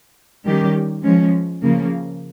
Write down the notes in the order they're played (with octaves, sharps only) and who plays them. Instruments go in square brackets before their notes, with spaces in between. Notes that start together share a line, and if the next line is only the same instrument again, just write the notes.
[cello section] D#3 G3 C#4 G4
F3 G#3 C#4
C#3 F3 A#3